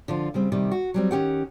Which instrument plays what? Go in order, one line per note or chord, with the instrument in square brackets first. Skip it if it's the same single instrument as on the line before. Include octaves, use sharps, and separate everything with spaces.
[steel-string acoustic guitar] D3 F3 F4
C#3 G3 C4
C3 D#3 G3
F#4
F#3 G3 C4
D#3 C#4 G4 F#5